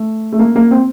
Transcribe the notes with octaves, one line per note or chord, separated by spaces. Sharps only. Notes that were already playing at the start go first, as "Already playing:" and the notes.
Already playing: A3
A3
A#3
A#3
C4